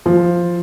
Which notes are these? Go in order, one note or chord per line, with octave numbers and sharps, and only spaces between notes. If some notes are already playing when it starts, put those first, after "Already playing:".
F3